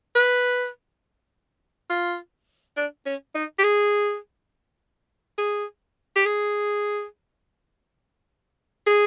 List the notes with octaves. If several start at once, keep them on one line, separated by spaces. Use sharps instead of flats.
B4
F4
D4
C#4
D#4
G4
G#4
G#4
G4
G#4
G#4